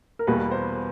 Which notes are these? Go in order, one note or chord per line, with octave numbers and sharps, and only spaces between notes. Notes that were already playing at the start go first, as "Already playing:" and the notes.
A#4
E2 B2 G3 A#3 B4
C5